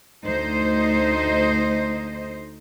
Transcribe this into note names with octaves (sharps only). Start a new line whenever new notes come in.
D2 D#4 C5 D#5